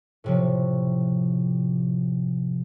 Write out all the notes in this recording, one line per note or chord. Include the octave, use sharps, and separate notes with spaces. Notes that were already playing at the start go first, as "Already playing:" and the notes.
A2 C3 F3